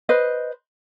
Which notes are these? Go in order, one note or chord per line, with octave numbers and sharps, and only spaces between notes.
B4 C5 D#5